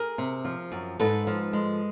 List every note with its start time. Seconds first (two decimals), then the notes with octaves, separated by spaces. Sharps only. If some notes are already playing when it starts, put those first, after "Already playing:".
Already playing: G#4 A#4
0.18 C3
0.45 F3
0.72 F#2
1.00 G#2 A4 B4
1.27 F3
1.53 G#3